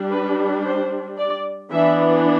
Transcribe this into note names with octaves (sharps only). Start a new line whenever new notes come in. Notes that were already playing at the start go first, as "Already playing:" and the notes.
Already playing: G3 D4
B4
C5
D5
E3 B3 D4 E5